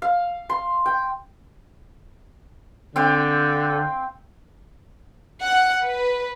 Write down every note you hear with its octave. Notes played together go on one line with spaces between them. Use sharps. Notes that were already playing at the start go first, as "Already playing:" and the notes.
F5
C6
G5
D3 C4 F5 G5
F#5
B4